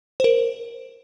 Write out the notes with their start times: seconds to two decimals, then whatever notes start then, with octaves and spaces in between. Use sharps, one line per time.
0.20 C5
0.24 A#4